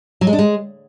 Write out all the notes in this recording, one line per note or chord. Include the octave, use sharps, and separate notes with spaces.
F#3
G#3
D4
G#3